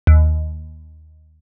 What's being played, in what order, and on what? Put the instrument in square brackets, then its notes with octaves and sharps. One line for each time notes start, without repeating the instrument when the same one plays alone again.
[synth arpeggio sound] D#2